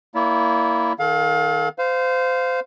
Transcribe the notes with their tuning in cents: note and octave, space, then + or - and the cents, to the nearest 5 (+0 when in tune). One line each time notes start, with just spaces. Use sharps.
A#3 +0 E4 +0 D5 -45
D#3 +0 A4 -40 F5 +25
C5 -25 F5 +0